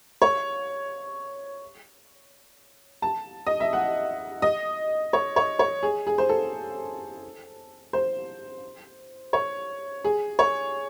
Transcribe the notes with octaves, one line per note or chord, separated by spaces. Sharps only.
C#5
A5
D#5
E5
F#5
D#5
C#5
C#5
C#5
G#4
G#4
C5
A4
C5
C#5
G#4
C#5